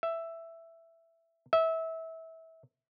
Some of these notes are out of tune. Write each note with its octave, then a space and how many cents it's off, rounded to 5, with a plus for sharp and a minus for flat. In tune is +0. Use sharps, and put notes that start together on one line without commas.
E5 +5
E5 -25